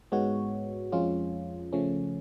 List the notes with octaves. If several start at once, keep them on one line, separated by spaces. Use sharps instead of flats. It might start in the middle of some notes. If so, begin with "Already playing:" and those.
G#2 G#3 B3 F#4 C#5
F2 F3 G#3 C#4 F4
C#3 F3 A3 C#4